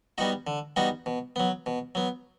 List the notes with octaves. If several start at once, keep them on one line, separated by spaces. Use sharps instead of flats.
G3 B3 D#4 F#4
D3
G3 B3 D#4 F#4
B2
F#3 B3
B2
F#3 B3